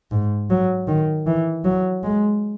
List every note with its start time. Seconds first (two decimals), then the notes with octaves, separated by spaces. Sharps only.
0.11 G#2
0.50 F#3
0.88 D#3
1.26 E3
1.64 F#3
2.03 G#3